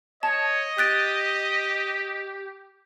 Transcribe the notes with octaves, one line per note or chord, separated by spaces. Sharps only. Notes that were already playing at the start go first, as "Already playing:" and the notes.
C#5 D#5 A5
G4 F#6 A6 D7